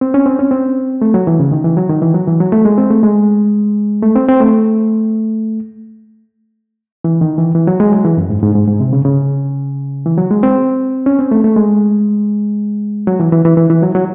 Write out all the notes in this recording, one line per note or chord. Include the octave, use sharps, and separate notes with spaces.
C4
C#4
C4
C#4
C4
A3
F#3
E3
C#3
D#3
E3
F#3
D#3
E3
F#3
E3
F#3
A3
G#3
C4
A3
G#3
A3
C4
C4
A3
E3
D#3
E3
E3
F#3
G#3
F#3
E3
F#2
G#2
G#2
G#2
G#2
C3
C#3
C#3
E3
F#3
G#3
C4
C#4
C4
A3
A3
G#3
F#3
E3
E3
E3
E3
E3
F#3
F#3